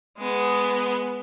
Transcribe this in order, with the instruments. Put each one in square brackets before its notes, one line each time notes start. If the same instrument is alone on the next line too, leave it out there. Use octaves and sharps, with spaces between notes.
[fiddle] G#3 B3